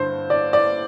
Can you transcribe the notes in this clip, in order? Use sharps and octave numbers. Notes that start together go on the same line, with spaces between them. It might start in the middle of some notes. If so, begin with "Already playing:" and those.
Already playing: G2 D3 C5
D5
D5